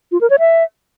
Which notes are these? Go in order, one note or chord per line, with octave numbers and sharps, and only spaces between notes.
F4
A#4
C#5
E5